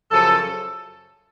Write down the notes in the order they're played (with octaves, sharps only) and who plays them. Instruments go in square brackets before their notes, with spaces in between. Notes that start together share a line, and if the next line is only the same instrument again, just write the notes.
[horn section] F#2 C#3 F3 A4